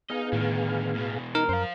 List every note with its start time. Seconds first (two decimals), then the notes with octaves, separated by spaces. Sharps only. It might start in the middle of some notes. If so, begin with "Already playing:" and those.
0.10 B3 D#4 G#4 D#5 F5
0.33 A2 D3 D#3
0.94 E2 B2
1.35 D#4 A#4
1.49 F#2 C5 F5